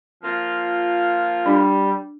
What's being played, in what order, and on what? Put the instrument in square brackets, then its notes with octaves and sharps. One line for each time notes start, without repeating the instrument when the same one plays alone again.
[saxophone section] F3 A#3 F4
[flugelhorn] G3 [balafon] D4